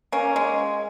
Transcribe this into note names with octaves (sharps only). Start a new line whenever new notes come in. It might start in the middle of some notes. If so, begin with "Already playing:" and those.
A#3 C#4
G#3